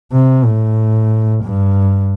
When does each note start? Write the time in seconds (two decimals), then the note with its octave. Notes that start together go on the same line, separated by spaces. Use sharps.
0.12 C3
0.45 A2
1.44 G2